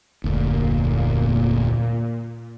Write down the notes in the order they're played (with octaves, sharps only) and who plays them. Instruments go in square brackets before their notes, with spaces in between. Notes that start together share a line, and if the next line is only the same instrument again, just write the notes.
[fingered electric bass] F1 D2 [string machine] A#2